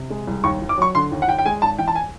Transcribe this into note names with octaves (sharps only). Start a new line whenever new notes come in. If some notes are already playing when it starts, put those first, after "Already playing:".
Already playing: C3
G#3
C2
D#2 C#6
D#2
D6
F#3 C#6
D3 C6
D#2
F#5
D#2 G5
G5
G#3 G#5
G#1 A5
E3 G5
A5
G#5